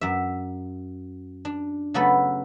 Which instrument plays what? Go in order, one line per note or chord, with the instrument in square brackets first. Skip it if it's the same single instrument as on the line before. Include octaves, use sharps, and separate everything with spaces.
[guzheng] F#2 E5
D4
C#3 F#3 A3 B3 A4 B4